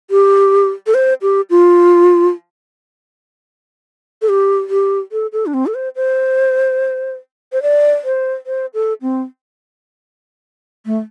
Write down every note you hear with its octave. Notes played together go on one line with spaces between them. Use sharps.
G4
A4
C5
G4
F4
A4
G4
G4
A4
A4
D4
C4
A4
C5
C5
C5
D5
C5
C5
A4
C4
A3